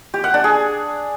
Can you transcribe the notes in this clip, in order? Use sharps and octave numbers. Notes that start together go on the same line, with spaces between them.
G4
F#5
D4
G#4